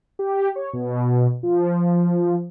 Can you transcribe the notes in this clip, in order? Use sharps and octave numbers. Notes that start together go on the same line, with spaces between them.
G4
C#5
B2
F3